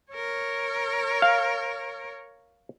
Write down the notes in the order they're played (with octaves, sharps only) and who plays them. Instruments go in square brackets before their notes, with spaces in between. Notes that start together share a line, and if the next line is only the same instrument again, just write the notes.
[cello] A#4 C#5
[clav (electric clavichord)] F5